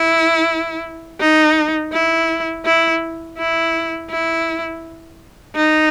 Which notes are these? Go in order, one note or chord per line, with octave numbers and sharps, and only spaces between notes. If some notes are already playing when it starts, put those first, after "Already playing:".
Already playing: E4
D#4
E4
E4
E4
E4
D#4